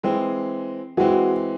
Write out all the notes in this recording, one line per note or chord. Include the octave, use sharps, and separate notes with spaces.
E3 G#3 C4
E3 G#3 C4 F#4